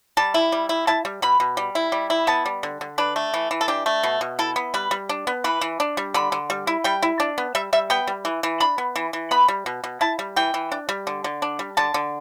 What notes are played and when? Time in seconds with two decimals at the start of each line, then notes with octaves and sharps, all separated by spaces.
0.17 G3 A5
0.34 E4
0.52 G3
0.69 E4
0.87 E4 A5
1.05 G3
1.22 B2 B5
1.40 B2
1.57 G3
1.75 E4
1.92 G3
2.10 E4
2.27 B3 A5
2.45 G3
2.63 D3
2.81 D3
2.98 D4 B4
3.16 A3
3.34 E3
3.51 E3
3.61 A4
3.68 D4 G4
3.86 A3
4.03 B2
4.21 B2
4.39 E4 A4
4.56 B3
4.74 G3 B4
4.91 G3
5.09 D4
5.27 B3
5.44 E3 B4
5.61 E3
5.80 D4
5.97 G3
6.14 D3 B5
6.32 D3
6.50 G3
6.67 E4
6.84 G3 G5
7.02 E4
7.20 D4
7.38 B3
7.55 G3 E5
7.73 G3 E5
7.90 B3 G5
8.07 G3
8.25 E3
8.43 E3
8.60 D4 B5
8.78 B3
8.96 E3
9.13 E3
9.31 B3 B5
9.48 G3
9.66 B2
9.84 B2
10.01 E4 A5
10.19 G3
10.36 E3 G5
10.54 E3
10.72 D4
10.89 G3
11.07 D3
11.24 D3
11.42 D4
11.59 G3
11.77 D3 A5
11.94 D3